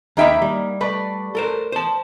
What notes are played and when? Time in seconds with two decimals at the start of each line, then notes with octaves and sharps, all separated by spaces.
0.17 D#2 A#3 D#4 E5 G5 B5
0.42 G3
0.81 A3 B4 D5
1.35 A4 A#4 C5
1.72 C5 A5